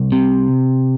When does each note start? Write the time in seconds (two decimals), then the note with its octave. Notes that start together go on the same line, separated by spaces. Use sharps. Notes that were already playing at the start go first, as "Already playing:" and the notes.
Already playing: C2
0.12 C3